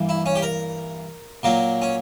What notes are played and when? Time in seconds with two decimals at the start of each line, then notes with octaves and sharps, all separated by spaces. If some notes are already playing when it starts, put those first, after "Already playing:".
Already playing: G2 E3 A#3
0.09 E4
0.26 C#4
0.35 G4
0.43 A#4
1.43 A#2 F#3 A#3
1.82 C#4